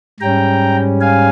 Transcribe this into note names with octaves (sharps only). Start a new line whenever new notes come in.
G#2 G3 C#4 G5 A#5
F5 G#5